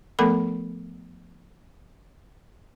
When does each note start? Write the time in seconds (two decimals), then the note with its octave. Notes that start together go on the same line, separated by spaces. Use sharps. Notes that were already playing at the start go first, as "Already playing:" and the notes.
0.19 F3 A3 B3 A4 A#4 B5